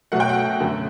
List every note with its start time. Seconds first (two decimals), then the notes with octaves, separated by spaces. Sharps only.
0.12 B2 F#3 A3 F#5
0.20 G5
0.29 F#5
0.60 F#2 D3 A3